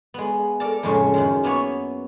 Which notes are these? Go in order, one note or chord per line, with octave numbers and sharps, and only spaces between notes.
G#3 B3
A4 A#4 D5 A5
F2 A2 C#3 G#3 A4 E5
F#2 D#3 G#3
A#3 B3 B4 C#5 E5